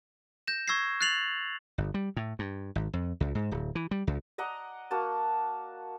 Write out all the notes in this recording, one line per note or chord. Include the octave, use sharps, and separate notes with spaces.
G6 A#6 E7
C#6 E6 G#6 A#6 C7
F#6 A6 C7 F7 F#7
G1
G3
A2
G2
G#1
F2
C#2
G#2
D1
E3
G3
C#2
D5 D#5 F#5 A#5
A#3 F#4 A5